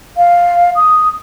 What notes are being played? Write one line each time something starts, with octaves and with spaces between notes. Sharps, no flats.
F5
D#6